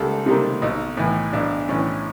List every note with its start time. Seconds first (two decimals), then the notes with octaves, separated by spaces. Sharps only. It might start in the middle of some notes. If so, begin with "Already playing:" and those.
Already playing: C#2 D#3 G3 A#3 A4
0.26 C3 D#3 G3 A#3
0.62 B1 D#4
0.97 A2 E3
1.33 B1 D4
1.69 A2 E3 C#4